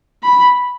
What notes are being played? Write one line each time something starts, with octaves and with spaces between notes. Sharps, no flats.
B5